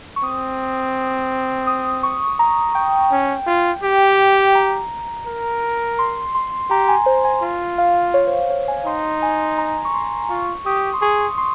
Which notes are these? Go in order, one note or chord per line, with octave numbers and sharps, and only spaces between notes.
C#6
C4 D#6
D#6
C#6
A#5
G5
C#4
F4
G4
A#5
A#4
C6
C6
G4 A#5
G#5
C5
G#5
F4
F5
C#5
C5
C#5
C#5
G#5
D#4 C6
G#5
A#5
C#6
C6
F4 C#6
G4 D#6
C6
G#4 C#6
C6